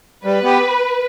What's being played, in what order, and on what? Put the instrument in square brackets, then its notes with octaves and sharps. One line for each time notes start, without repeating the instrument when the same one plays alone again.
[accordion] G3 [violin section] B4
[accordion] B3 G4